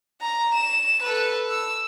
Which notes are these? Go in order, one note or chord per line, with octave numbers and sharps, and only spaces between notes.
A#5
E7
A4 B4
E6